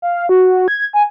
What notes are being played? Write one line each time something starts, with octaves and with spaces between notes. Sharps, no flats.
F5
F#4
G#6
G#5